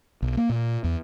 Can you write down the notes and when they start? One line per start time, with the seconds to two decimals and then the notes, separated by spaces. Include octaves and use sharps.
0.22 B1
0.37 A#3
0.49 A#2
0.84 E2